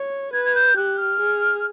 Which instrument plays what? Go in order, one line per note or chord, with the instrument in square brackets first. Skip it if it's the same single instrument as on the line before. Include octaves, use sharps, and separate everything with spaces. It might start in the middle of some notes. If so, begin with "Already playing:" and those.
Already playing: [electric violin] C#5
[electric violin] B4 [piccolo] G#6
[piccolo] G#6
G6
[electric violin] G4 [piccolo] F#6
[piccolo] F6
[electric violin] G#4